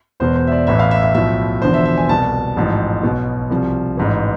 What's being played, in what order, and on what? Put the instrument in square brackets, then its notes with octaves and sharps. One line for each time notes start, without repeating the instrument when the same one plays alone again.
[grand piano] E1 E2 B2 C5
C5
E5
D5
A1 A2 E3 E5
F5
E5
E5
B1 A2 F3 E5
E1 E2 D3 F3 C5
E5
E5
G#5
C2 B2 A5
A1 G#2 F3
B1 B2
C2 C3 F3
A1 G#2 E3